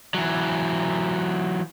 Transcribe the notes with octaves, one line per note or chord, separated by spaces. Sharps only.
E3 F#3